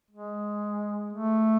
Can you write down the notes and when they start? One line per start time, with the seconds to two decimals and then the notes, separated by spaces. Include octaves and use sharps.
0.11 G#3
1.13 A3